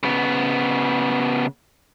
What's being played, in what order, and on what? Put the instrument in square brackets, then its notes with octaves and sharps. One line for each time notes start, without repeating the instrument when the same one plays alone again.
[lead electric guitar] C#3 B3